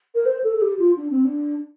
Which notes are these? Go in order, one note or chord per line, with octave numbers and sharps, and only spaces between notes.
A#4
C5
A4
A4
G4
F4
D4
C4
D4